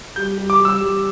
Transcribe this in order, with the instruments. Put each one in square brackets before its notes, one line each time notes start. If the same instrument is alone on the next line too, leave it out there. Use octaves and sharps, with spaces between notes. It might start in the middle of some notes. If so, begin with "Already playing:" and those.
[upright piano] G3 [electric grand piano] G6
[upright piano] G3
[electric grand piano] D6
[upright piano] G3
[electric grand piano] E6
[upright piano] G3